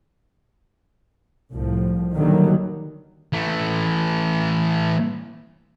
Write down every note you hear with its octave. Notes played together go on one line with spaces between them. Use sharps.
C2 A2 F3
B2 D3 D#3 F#3 G3 A#3
E3 A3